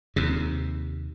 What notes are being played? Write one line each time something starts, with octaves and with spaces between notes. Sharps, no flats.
D#2 C3